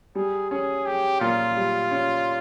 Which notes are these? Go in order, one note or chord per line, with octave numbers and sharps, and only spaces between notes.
G3 G#4
C#4 G#4
G4 G#4
A#2 F4
G3
C#4